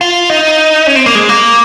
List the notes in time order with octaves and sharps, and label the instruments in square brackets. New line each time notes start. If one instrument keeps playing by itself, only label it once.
[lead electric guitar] F4
D#4
C#4
C4
A#3
G#3
A#3